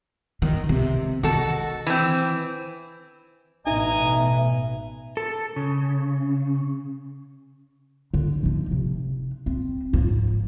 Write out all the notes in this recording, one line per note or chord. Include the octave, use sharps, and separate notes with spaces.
D#3
C3
D#3 F#4 A4
E3 C4
A1 B2 D#4 D#5 E5 G#5 A#5
A4
C#3
D3
F3 D#4
C3
C4
G#2 F3